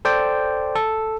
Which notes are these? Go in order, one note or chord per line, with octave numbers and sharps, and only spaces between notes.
A4 C5 D5 G5
A4